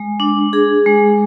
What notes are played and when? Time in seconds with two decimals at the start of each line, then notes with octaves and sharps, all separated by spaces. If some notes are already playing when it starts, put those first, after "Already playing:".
Already playing: G#3
0.20 D4
0.53 G#4
0.86 G#3